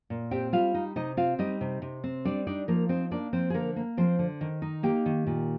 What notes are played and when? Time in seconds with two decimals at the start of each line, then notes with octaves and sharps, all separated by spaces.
0.10 A#2
0.31 C4 G4 G5
0.53 G3 F4 F5
0.74 D#4
0.96 C3 D#4 D#5
1.17 C4 F4 F5
1.39 G3 D#4 D#5
1.61 C3
1.82 C3
2.04 C4
2.25 G3 D4 D5
2.47 D4 D#4 D5
2.68 F3 A#3 A#4
2.89 C4 D#4 C5
3.11 A#3 D4 D5
3.33 F3 C4 C5
3.50 G#4
3.54 D3 A#3 A#4
3.76 A#3
3.97 F3 C4 C5
4.19 D3
4.41 D#3
4.62 D#4
4.83 A#3 G4 G5
5.06 D#3
5.27 A#2